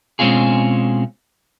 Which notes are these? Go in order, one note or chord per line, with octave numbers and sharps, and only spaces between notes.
B2 G#3 C4 C#4 F4 G#4